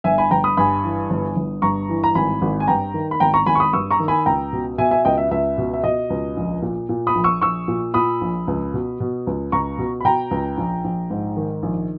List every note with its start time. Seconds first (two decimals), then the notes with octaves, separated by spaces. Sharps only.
0.04 G1 E5 G#5
0.18 G#5 B5
0.31 G1 G5 A#5
0.44 B5 D#6
0.57 G2 G#5 B5
0.84 E3
1.10 G1
1.36 G1
1.62 G2 A#5 C#6
1.89 E3
2.04 A#5
2.15 G#1 G#5 B5
2.41 G#1
2.60 G#5
2.67 G2 G5 A#5
2.94 D#3
3.11 B5
3.20 G#1 G5 A#5
3.34 A#5 C#6
3.46 G#1 G#5 B5
3.55 C#6
3.60 B5 D#6
3.73 G2 C#6 E6
3.90 A#5 C#6
4.00 D#3
4.08 G#5 B5
4.26 C#2 G5 A#5
4.53 B2
4.78 B2 E5 G#5
4.91 E5 G#5
5.05 C#2 D#5 G5
5.18 E5
5.31 C#2 E5
5.58 B2
5.74 E5
5.84 B2 D#5
6.10 C#2
6.37 A#1
6.62 A#2
6.89 A#2
7.07 B5 D#6
7.15 A#1
7.24 C#6 E6
7.41 A#1 C#6 E6
7.68 A#2
7.94 A#2 B5 D#6
8.21 A#1
8.47 C#2
8.74 B2
9.00 B2
9.27 C#2
9.52 C#2 A#5 C#6
9.78 B2
10.00 B5
10.05 B2 G5 A#5
10.31 C#2
10.57 A#1
10.84 A#1
11.10 G#2
11.37 D#3
11.63 A#1